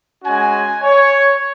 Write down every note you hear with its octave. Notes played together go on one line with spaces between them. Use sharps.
G#3 C#4 F#4 G#5
C#5